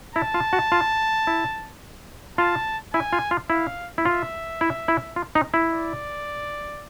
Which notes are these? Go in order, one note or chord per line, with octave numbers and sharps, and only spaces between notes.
E4 A5
F4
F#4
F4
E4
F4 A5
E4 G#5
F4
F4
E4 F5
E4
F4 E5
E4
E4
F4
D#4
E4
D5